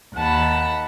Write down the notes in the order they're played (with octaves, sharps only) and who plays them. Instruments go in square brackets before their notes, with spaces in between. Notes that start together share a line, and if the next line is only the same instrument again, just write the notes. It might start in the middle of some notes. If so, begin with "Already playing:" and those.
[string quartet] D#2 F#5 A5 B5